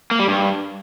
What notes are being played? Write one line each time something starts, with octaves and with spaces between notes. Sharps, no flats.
A#3
G3
G2